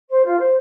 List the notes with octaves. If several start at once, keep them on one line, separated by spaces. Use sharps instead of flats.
C5
F4
C5